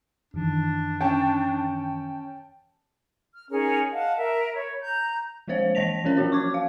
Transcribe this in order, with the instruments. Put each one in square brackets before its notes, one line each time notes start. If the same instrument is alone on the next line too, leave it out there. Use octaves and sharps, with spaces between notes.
[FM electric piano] F#2 D#3 E3 [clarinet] D4
[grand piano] C#4 [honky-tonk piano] G5 A5
[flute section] F6
C#4 D#4 G#4 A#4
D#5 F5 F#5 A5
A#4 E5
C#5 B5
A#5 G6
[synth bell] F3 G#3 A#3 C5 C#5 F5
E3 D#5 A5 A#6 B6 F7
F3 F#3 C#4 A#4 C#5
F#3 A#3 C#4 F#4 C#5
C#6 D6 G#6
F5